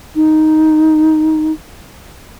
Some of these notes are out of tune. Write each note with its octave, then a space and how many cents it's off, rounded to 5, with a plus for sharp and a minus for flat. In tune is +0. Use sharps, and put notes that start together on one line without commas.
D#4 +5